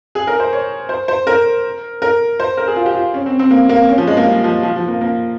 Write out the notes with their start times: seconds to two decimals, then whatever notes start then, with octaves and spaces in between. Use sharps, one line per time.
0.15 G#4
0.27 A#4
0.40 C5
0.53 C#5
0.89 C5
1.08 C5
1.27 A#4
2.02 A#4
2.40 C5
2.57 A#4
2.68 G#4
2.76 F4
2.86 G4
2.95 F4
3.14 C#4
3.26 C4
3.39 C4
3.51 A#3
3.69 A#3
3.89 C#4
3.98 F3
4.07 G#3
4.17 A#3
4.26 G3
4.44 F3
4.63 F3
4.76 F3
4.88 A#3
5.01 A#3